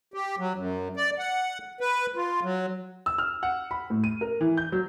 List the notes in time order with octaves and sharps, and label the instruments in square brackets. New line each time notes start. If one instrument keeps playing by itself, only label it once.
[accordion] G4
F#3
F#2
D5
F#5
B4
F4
F#3
[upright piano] E6
F6
F#5
B5
A2
D#7
A#4
E3
G6
F#3